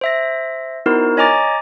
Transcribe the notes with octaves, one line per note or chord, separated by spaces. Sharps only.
C5 E5 A#6
B3 D#4 E4 F#4 A#4 C5
C#5 D#5 G#5 A#5 D6 A6